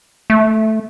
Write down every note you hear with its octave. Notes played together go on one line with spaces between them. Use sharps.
A3